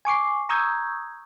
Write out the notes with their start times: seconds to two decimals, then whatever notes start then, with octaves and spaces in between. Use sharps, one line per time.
0.05 G#5 C#6 D6 C7
0.49 A#5 C#6 D#6 E6 G6 G#6